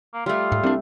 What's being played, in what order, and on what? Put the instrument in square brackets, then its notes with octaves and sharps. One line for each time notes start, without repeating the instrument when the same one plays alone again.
[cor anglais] A#3
[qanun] G3 A3 [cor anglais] F4
[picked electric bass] G#2
[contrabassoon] C2 [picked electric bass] G3 D4